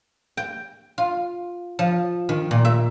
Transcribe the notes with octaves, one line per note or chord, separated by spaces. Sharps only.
G5
F4
F3
D#3
A#2
E5